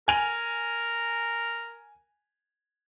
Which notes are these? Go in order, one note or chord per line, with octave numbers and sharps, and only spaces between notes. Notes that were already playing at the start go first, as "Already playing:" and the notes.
A#4 G#5 F7